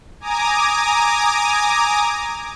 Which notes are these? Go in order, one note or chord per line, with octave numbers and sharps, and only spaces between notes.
G#5 A#5 D6 D#6